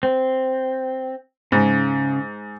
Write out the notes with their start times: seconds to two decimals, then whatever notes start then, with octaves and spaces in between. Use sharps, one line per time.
0.03 C4
1.52 G#2 C#3